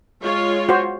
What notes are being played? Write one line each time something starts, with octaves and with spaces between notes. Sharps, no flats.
G#3 F4 C#5
F#4 C5